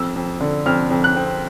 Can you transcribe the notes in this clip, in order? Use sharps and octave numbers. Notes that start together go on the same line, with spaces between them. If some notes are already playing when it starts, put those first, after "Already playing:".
Already playing: F2 E6
F2
D3
F2 F6
F2
F#6
C4